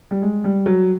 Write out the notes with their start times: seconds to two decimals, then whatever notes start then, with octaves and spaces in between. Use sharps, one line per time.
0.11 G3
0.22 G#3
0.44 G3
0.66 F#3